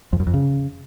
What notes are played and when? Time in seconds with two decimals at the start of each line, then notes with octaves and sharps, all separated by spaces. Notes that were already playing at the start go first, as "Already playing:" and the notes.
0.13 F2
0.20 F#2
0.27 F2
0.34 C#3